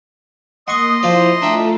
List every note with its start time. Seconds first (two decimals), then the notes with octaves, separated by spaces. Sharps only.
0.68 A#3 D#5 F#5 C6 C#6 D#6
1.03 F3 E4 F4 C5 D5
1.42 A3 D4 F4 A4 E5 G5 A#5